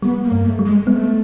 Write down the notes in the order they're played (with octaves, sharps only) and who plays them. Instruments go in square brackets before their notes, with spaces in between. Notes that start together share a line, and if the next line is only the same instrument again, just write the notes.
[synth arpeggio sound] G3 [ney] B3
[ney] A#3
[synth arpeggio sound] G2
[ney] A3
[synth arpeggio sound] G3
[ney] G#3
[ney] A3 [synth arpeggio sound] B3